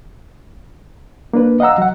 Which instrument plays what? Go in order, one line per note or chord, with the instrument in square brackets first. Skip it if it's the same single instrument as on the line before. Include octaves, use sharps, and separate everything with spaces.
[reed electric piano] A#3 D4 B4
D#5 F5 F#5 A#5 E6
F#3 F#5